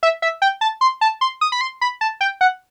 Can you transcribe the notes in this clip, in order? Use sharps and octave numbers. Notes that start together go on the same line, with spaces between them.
E5
E5
G5
A5
C6
A5
C6
D#6
B5
C6
B5
A5
G5
F#5